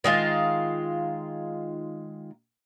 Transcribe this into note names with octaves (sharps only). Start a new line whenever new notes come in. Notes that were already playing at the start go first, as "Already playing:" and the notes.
D#3 G#3 F4